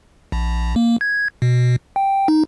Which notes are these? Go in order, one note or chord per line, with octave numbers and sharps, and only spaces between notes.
A#1
A#3
G#6
B2
G5
D#4